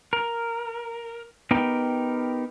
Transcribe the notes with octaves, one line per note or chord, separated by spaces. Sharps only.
A#4
B3 D#4 G4 A#4 G5